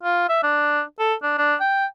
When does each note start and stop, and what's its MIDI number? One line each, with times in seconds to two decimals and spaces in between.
0.03 0.26 65
0.29 0.42 76
0.43 0.82 62
0.99 1.14 69
1.23 1.34 62
1.38 1.55 62
1.60 1.85 79